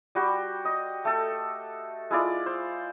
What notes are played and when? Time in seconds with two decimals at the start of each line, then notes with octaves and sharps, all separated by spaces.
0.15 G3 F#4 G4
0.65 D#5
1.05 A3 A4
2.10 G#3 E4 F4 D5
2.46 C5